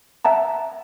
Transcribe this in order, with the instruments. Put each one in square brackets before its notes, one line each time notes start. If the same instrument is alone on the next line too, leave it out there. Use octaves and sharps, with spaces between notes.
[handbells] E5 F#5 A5 A#5